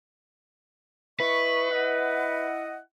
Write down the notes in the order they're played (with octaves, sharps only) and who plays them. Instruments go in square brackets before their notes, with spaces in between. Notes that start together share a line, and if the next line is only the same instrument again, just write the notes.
[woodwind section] E4 D#5 C#6 [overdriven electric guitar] B4
[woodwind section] E4 D#5 F#5